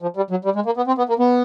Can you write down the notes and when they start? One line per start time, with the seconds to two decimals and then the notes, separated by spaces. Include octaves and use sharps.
0.02 F3
0.16 G3
0.30 F#3
0.45 G3
0.55 G#3
0.66 A#3
0.77 B3
0.87 C4
0.98 B3
1.09 A#3
1.19 B3